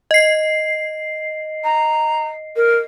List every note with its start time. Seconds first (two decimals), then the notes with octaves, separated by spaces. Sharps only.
0.11 D#5 C7
1.64 A#5
2.56 A#4